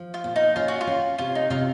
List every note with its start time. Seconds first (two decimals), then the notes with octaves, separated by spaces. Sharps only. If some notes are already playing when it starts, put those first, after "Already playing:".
Already playing: F3
0.14 F4
0.24 A#2
0.36 D#4
0.56 C#4 F4
0.68 F#4
0.81 F4
0.87 C#4
1.18 C3 F4
1.35 D#4
1.50 C3 F4